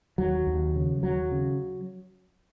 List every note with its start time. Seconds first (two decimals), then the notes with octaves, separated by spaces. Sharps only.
0.18 D#2 F#3
0.47 D#2
0.76 C#3
1.03 D#2 F#3
1.32 C#3